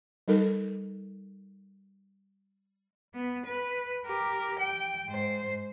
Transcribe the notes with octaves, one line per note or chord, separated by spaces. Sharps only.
G3 D#4 A4 A#4
B3
B4
G4 A#4
G5
G#2 C5